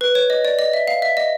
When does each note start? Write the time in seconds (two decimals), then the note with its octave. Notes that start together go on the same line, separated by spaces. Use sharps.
0.01 B4
0.15 C#5
0.30 D#5
0.45 D5
0.59 D#5
0.73 E5
0.88 F5
1.02 E5
1.17 D#5